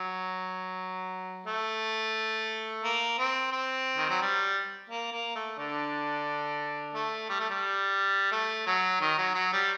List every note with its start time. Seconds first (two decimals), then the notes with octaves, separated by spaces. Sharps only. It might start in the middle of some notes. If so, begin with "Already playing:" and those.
Already playing: F#3
1.46 A3
2.84 A#3
3.19 C4
3.52 C4
3.97 D#3
4.09 F#3
4.21 G3
4.89 A#3
5.12 A#3
5.35 A3
5.58 D3 D4
6.95 A3
7.29 G3
7.40 A3
7.50 G3
8.32 A3
8.66 F#3
9.01 D#3
9.18 F#3
9.35 F#3
9.53 G3